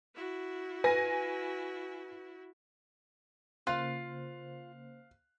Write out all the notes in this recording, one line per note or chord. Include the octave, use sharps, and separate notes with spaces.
E4 F#4
B4 G#5 A#6
C#3 A#3 F4 C5 F5 F#6